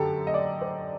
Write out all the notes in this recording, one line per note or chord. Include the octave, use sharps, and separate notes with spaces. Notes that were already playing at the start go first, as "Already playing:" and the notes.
Already playing: F#2 D3 G4 A4
D#5
D5
C5